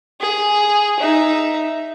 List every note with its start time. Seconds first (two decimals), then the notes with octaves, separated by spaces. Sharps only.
0.21 G#4
1.00 D#4 E5